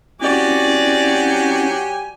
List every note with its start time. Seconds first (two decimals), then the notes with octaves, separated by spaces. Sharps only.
0.21 F#3 C4 C#4 E4 F#4 G4 D5 G#5